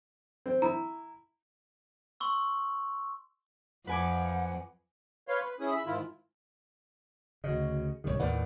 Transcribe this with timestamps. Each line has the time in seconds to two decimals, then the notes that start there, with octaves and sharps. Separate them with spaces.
0.46 C4
0.62 E4 A#5
2.20 C6 C#6 E6
3.87 F2 B4 F#5 G#5 D6
5.28 B4 C#5 F5 C6
5.44 B4
5.60 C#4 E4 G#4 D#6
5.71 E5 B5
5.86 G#2 D#3 E4 F4
7.44 D2 C#3 F#4 D#5
8.04 C2 G#2 D#3 G4 C#5
8.20 D#2 A2 D#3 B4 D5 F#5